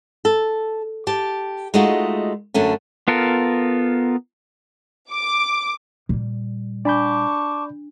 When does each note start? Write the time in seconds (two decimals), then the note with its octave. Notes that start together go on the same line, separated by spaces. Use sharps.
0.25 A4
1.07 G4 A5
1.74 G#3 A3 D#4 F4 F#4
2.54 F#2 D3 A3 C#4
3.08 B3 F4 A4 A#4
5.12 D6
6.09 A#2 G3
6.85 D4 D5 A5 B5 C#6 D6 G6